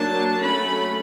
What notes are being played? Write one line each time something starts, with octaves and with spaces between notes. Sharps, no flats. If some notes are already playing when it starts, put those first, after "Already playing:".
Already playing: F#3 A#3 D4 A5
F#3 A3 C#4 B5